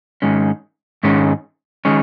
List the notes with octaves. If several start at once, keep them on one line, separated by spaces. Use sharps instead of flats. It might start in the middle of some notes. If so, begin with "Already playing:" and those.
G#2 D#3 G#3 C#4
G#2 D#3 G#3 C#4
D#3 G#3 C#4